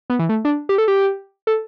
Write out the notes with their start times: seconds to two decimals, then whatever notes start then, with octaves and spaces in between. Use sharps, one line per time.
0.10 B3
0.19 E3
0.29 A3
0.45 D4
0.69 G4
0.78 A4
0.88 G4
1.47 A4